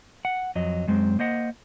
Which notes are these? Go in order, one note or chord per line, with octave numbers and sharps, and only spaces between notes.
F#5
F2 F#3 D#5
F#2 G#3 C4
A#3 C5 D#5 F#5